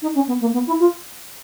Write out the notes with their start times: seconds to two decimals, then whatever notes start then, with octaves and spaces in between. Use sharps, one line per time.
0.02 D#4
0.15 C#4
0.27 B3
0.41 A#3
0.53 B3
0.67 E4
0.80 F4